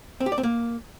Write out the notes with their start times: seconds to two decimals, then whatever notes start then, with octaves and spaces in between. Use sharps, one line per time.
0.20 C4
0.26 G4
0.32 D5
0.38 C4
0.43 A#3